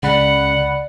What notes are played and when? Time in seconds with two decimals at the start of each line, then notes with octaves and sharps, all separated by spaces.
0.03 C#2 C#3 D5 F#5 B5 C#7